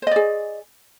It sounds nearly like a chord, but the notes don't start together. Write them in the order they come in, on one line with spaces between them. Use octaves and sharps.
C5 D#5 D5 G#4